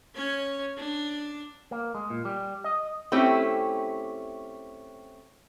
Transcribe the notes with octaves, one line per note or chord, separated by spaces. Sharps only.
C#4 C#5
D4
A#3
G#3
A#2
G3
D#5
A3 C4 C#4 E4 G4